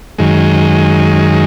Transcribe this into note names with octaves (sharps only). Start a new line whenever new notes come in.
F#2 D#3 G#3